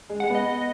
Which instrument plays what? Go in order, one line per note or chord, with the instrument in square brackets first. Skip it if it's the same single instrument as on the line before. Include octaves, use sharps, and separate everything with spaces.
[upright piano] G#3
[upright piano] G#3 [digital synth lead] F#5
[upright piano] B3
[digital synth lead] D#5
D#5